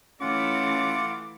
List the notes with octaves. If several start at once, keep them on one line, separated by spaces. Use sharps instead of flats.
E3 A3 C#4 F4 F#5 D6